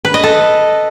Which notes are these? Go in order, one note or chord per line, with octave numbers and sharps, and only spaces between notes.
B4
D#5
A4